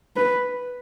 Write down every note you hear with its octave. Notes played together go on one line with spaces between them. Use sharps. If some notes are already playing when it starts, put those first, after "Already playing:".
B4